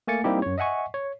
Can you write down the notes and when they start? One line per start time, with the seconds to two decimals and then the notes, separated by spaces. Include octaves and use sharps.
0.07 A3 A#3 G#5 A6 C#7
0.24 G3 A#3 C4 D#4 E4 G4
0.42 F#2 C#5
0.58 D#5 E5 F#5 G#5 C#6
0.94 C#5